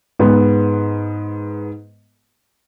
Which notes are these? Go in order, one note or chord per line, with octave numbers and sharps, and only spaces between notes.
G#2 B3